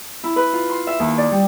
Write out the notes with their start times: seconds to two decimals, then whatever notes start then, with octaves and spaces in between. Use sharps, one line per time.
0.24 E4
0.36 B4
0.53 F4
0.70 C6
0.87 E5
1.00 D#2
1.18 D5
1.31 G3